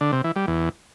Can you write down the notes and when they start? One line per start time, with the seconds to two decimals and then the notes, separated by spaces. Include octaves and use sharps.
0.01 D3
0.12 C3
0.24 E3
0.36 G3
0.47 E2